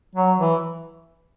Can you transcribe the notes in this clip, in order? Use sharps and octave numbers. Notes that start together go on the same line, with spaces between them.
F#3
E3